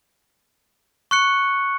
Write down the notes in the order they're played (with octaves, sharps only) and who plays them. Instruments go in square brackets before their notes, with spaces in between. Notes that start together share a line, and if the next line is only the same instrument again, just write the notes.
[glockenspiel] C#6 F#6 C#7